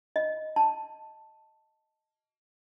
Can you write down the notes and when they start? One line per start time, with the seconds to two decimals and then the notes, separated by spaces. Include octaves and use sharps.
0.16 D#5
0.56 A5